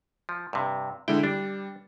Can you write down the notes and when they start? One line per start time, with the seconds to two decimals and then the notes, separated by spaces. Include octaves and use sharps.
0.29 F3
0.53 G2 C3
1.08 D3 G#3 E4 G5
1.23 G3 D4